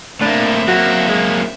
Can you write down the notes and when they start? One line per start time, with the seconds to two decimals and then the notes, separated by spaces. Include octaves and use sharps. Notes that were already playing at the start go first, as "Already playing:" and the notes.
0.21 A2 A#3 C4 D4 E5
0.68 F#3 A#3 F#4
1.09 G#3